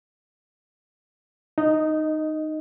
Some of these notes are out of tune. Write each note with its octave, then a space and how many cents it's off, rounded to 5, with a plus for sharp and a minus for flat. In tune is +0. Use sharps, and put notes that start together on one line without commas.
D#4 -10 D#5 +5